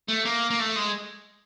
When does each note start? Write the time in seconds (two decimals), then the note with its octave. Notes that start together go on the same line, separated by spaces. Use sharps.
0.09 A3
0.25 A#3
0.50 A#3
0.59 A3
0.76 G#3